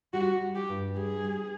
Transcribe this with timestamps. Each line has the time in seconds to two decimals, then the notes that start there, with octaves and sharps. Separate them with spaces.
0.13 G3 F#4
0.41 G3
0.55 G4
0.69 G2
0.96 G3 G#4
1.24 G3